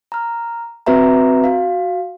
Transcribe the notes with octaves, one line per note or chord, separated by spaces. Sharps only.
A#5 F6
C4 F#4 B4 E5 A#5
F#4 F5